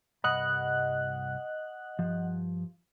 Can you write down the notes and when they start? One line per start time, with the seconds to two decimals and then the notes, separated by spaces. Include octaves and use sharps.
0.24 C2 G2 D#5 F#5 B5 F#6
1.99 G2 F3